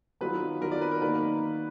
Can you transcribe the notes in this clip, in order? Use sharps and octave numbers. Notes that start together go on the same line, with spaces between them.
D#3 F#3 B3 F4 B4
D#3 F#3 B3 F4 A#4
D5
B4
A#4
D#3 A#3 D#4 F#4 B4 D5